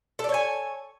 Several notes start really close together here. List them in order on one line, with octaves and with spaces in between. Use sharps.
A4 D5 C#5 G#5